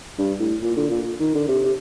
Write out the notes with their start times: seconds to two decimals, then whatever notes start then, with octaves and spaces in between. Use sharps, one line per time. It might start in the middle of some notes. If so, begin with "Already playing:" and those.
0.18 G2
0.40 A2
0.62 A#2
0.76 D3
0.90 A#2
1.20 D#3
1.35 D3
1.49 C3
1.65 C3